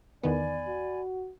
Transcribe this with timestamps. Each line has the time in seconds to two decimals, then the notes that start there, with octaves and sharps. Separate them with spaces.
0.23 E2 D#3 B3 D5 G#5 B5
0.67 F#4